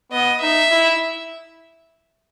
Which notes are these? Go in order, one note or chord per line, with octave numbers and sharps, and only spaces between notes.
B3 D#5
D#4 E5
E4